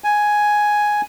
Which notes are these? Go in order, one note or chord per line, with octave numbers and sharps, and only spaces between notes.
G#5